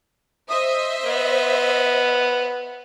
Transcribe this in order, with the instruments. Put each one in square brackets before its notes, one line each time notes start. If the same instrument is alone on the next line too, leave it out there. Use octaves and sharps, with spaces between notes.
[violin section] C5 D#5 E5 [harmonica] D#6
[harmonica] B3